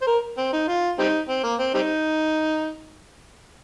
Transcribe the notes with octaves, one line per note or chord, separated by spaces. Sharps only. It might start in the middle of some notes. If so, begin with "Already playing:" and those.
C5
A#4
C4
D#4
F4
G3 C4 D#4
C4
A#3
C4
G3 C4 D#4